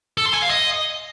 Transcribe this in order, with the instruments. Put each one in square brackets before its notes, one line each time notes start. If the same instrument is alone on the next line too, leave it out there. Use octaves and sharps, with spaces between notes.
[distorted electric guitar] A4
C6
G#5
F5
D#5